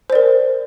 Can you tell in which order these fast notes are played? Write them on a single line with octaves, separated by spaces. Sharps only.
C5 D5 A#4